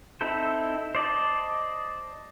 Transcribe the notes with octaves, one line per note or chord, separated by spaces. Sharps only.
C4 D#4 E4 A4 C5
C5 D5 D#5 A5